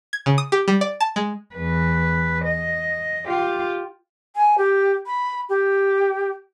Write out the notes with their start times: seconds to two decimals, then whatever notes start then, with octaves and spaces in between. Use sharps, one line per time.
0.13 G#6
0.26 C#3
0.38 D#6
0.52 G4
0.68 G3
0.81 D5
1.00 A5
1.16 G#3
1.55 E2 B4
2.45 D#5
3.27 F4 G4
4.36 G#5
4.58 G4
5.06 B5
5.49 G4